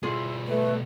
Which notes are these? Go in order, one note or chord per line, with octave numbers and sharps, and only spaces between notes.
B2 G3 E4 F4 G#4
A3 B4